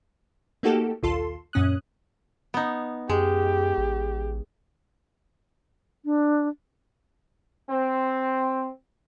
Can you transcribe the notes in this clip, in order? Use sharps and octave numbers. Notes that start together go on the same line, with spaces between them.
A3 A#3 D#4 F#4 G4 A4
A#1 D#2 F4 A4 C6
F#2 A#2 C#4 D#6 F#6
B3 D#4
F#2 G#3 G4
A1
D4
C4